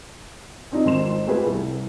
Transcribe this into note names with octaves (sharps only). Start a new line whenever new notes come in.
C4 D4 D#4 G4
G#1 F2 C6 E7
A3 B3 F4 G4 G#4 B4
C2